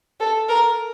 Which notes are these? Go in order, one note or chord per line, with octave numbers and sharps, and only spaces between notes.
A4
A#4